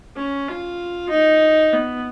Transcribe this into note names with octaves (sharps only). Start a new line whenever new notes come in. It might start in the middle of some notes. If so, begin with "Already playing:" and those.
C#4
F4
D#4
B3